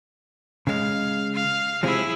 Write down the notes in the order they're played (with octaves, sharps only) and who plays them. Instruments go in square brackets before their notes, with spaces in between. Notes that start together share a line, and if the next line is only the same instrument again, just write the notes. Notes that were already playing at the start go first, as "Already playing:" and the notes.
[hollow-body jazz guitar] C#3 G#3 [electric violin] F5
[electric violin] F5
[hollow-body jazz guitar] C3 F3 G#3 [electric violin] E4 G#4